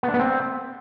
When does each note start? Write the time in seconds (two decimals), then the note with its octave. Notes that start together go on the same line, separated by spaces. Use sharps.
0.03 B3
0.09 D4
0.14 B3
0.19 C4